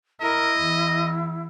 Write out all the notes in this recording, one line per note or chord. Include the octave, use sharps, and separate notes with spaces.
E4 A#4 D#5
E2